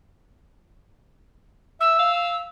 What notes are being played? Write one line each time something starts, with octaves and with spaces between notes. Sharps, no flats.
E5 E6
F5